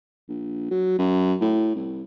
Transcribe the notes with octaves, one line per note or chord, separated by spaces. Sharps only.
A#1
F#3
F#2
A2
C2